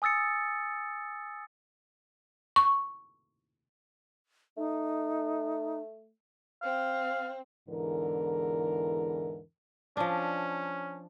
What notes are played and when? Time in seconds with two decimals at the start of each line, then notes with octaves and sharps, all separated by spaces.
0.02 G#5 D#6 E6 A6 C#7
2.56 C#6
4.57 A3 D#4
6.62 C4 F5
7.69 E2 G#2 D3 E3 A#4
9.97 F3 C#4 D4